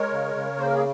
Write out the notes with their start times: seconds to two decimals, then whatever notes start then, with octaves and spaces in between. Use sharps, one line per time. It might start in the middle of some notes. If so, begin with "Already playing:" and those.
Already playing: G#3 A#4 C#5
0.12 C#3
0.35 C#3
0.58 A#3 C5
0.67 A#4
0.74 G#4